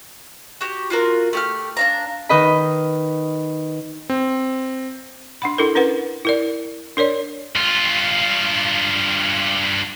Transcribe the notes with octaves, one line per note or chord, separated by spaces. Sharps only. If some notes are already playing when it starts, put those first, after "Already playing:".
F#4 G4
F4 F#4 A#4
A3 G4 F6
D4 F5 A#5
D#3 B4 D#5 B5
C4
D4 F#5 B5
D4 E4 A4 A#4
C#4 A#4 B4 F#5
E4 A#4 D5
D4 A#4 C#5 D5
G2 F4